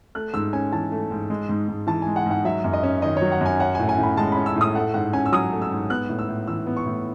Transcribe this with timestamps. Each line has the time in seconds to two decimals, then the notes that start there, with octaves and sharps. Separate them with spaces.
0.15 A3 F#6
0.34 G#2 E6
0.53 C#4 G#5
0.72 E3 A5
0.92 A3
1.11 G#2
1.30 G#3
1.49 G#2
1.68 G#2
1.87 E3 A5
2.02 G#3 G#5
2.16 F#5
2.26 G#2
2.31 F#5
2.45 F#3 E5
2.64 F#2
2.73 D#5
2.83 C#4
3.02 D#3 D#5
3.17 F#3 C#5
3.32 F#5
3.41 F#2 G#5
3.60 C#4 F#5
3.75 A2 G#5
3.89 G#5
3.98 A2 B5
4.17 G#3 A5
4.32 C#4 B5
4.46 E6
4.56 A2 D#6
4.75 A3 F#5
4.94 G#2 F#5
5.13 C#4 G#5
5.26 E6
5.32 F#3 D#6
5.52 A3
5.62 E6
5.71 G#2
5.90 B3 F#6
6.09 A2
6.19 E6
6.29 A2
6.48 E3 E6
6.67 B3
6.77 C#6
6.86 A2